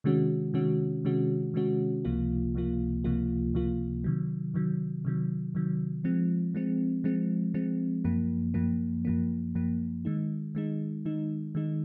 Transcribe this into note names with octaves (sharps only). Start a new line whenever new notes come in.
C3 D#3 G#3 C#4 F#4
C3 D#3 G#3 C#4 F#4
C3 D#3 G#3 C#4 F#4
C3 D#3 G#3 C#4 F#4
C#2 C3 F3 A#3 F4
C#2 C3 F3 A#3 F4
C#2 C3 F3 A#3 F4
C#2 C3 F3 A#3 F4
C3 D#3 F#3
C3 D#3 F#3
C3 D#3 F#3
C3 D#3 F#3
F3 G#3 C4
F3 G#3 C4
F3 G#3 C4
F3 G#3 C4
F#2 F3 A#3
F#2 F3 A#3
F#2 F3 A#3
F#2 F3 A#3
D#3 G#3 D#4
D#3 G#3 D#4
D#3 G#3 D#4
D#3 G#3 D#4